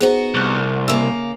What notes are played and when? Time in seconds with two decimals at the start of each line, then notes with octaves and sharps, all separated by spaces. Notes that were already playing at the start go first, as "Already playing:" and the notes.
0.01 B3 D#4 F#4 G#4 C5
0.35 C2 C#6 F#6
0.88 C#3 A#3 E5 E6